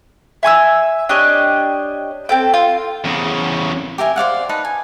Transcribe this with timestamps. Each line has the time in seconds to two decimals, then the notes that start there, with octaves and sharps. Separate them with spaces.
0.43 E5 G#5 C#6 E6
1.09 D4 G4 C#5 D#5
2.29 C4 A4 G5
2.54 F4
3.04 E2 C#3
3.98 G4 A#4 E5 G#5
4.16 C5 D5 F5 F#5
4.49 D#4 B4 A5
4.65 G#5